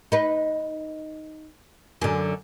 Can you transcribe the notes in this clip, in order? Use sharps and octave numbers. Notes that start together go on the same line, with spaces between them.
D#4 B4
F#2 D3